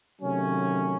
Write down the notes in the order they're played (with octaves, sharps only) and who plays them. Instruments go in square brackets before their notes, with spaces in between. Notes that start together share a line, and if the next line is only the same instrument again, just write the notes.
[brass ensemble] C3 D#3 F#3 A3 C#4